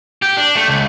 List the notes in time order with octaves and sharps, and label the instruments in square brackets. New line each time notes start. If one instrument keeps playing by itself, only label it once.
[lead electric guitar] G4
D4
A3
C#2